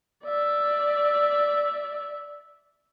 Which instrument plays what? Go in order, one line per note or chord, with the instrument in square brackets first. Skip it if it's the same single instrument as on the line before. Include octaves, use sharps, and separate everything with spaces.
[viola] D5 E5